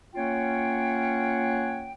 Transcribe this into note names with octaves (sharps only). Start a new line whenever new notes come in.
A#3 C#4 F4 C#5 F#5 G5